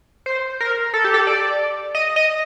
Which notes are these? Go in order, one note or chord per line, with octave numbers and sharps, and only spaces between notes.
C5
A#4
A4
G4
A4
D5
D#5
D#5